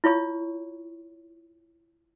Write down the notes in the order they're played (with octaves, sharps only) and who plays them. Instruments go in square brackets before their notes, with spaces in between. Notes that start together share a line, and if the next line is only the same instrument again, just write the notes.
[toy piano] E4 F4 C#5 C#6